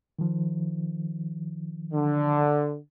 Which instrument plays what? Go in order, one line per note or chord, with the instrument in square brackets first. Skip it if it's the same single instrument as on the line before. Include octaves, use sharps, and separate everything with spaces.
[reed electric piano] D#3 F3
[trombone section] D3